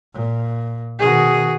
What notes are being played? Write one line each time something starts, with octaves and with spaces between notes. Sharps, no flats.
A#2
B2 D#3 F#4 G#4